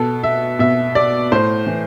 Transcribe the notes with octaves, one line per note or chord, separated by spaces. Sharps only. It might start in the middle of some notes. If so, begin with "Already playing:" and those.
Already playing: B2 A4
E5
B2 E5
D5
A2 C5
E3